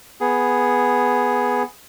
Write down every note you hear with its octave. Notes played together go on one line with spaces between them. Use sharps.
B3 G#4